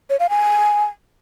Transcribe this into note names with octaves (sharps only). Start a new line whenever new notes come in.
C#5
F5
G#5